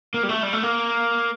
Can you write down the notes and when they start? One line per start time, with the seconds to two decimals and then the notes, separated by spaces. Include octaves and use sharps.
0.14 A#3
0.23 G3
0.29 A3
0.43 G3
0.53 A3
0.63 A#3